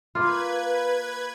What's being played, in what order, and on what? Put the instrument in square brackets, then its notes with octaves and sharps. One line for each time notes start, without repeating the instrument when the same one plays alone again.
[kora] A#3 F4 [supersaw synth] B4 G#6